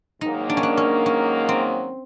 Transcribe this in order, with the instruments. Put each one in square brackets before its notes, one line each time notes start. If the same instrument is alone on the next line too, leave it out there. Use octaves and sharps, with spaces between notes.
[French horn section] G#2 D#3 F#3 A#3 [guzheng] D#4
[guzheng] D4
C#4
D4
C#4
C#4
C4